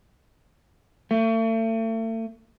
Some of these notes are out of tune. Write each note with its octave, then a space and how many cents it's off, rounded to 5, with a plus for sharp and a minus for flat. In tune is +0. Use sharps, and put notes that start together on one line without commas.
A3 +40